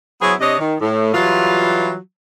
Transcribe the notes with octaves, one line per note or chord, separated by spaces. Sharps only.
F#3 B3 E4 G#4 C5
C3 D4 C#5 D#5
D#3
A2
E3 F#3 G3 F4